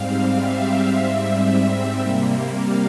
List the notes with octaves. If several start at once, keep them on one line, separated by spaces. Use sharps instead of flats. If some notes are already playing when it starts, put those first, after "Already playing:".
Already playing: G#2 G3 C4 F5
E5
G#2 G3 C4
C3 G3 A#3
F5